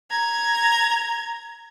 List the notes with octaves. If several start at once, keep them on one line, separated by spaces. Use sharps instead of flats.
A#5 G#6